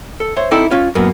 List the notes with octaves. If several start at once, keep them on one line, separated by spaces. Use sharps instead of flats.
A4
C5 C#5 E5
C4 D#4 E4 A4 D5 E5
C#4 F4 C#5
F#2 A2 A#3 B3